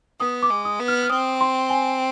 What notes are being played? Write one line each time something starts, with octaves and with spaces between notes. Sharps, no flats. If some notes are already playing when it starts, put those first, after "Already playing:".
B3 D#6
D6
G#3
D#6
B3
F6
F6
C4 D#6
C6
G#5